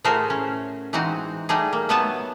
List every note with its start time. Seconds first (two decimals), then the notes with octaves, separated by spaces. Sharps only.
0.04 A2 A3 F#4 G#4 A#4 C5
0.30 C#4
0.93 E3 G#3 C4 D#4 F#4
1.49 G3 A3 D#4 G#4
1.73 A#3
1.89 F#3 A3 B3 C#5 G#5 A5